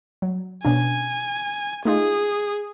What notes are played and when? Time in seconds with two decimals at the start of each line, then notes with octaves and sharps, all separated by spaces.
0.22 F#3
0.65 B2 C#4 D4 G#5
1.85 A3 D#4 F4 G#4